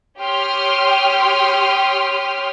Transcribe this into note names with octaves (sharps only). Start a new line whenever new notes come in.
G4 C#5 G5 C6 D#6 F6